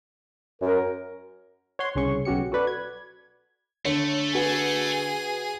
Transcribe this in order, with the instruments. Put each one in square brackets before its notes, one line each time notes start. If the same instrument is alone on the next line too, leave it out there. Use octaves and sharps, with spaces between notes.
[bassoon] F#2 [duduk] A#4
[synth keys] C#5 F#5 C6 G#6
C2 C#3 C#4 C#6
B1 C#4 F#4 G4 C#7
F#4 A4 B4 D5
G#6
[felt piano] D3 [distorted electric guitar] A3 [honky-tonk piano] C#5
[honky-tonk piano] F#4 B4 [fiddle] G#4 D#6